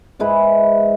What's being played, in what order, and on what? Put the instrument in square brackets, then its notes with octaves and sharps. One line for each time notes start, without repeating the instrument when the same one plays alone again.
[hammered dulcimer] G#2 G#3 E4 B4